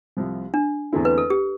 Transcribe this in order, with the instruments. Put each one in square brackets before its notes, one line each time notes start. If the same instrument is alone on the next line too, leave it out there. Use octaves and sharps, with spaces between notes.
[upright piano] C2 C3 F3
[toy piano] D4
[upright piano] E2 D3 A3 C4 E4
[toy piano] B4
A4
G4